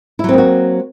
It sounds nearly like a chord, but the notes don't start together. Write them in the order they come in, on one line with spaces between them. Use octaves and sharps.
E4 F#3 C4 A#3 F#4